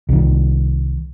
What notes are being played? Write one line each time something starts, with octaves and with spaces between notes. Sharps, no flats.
C2 D#3